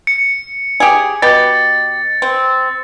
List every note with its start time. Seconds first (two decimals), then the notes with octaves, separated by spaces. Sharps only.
0.07 C#7
0.80 G4 G#4
1.22 B2 G4 A6
2.22 C4